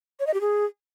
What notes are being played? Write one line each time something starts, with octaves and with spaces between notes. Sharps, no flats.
C#5
D#5
G4
G#4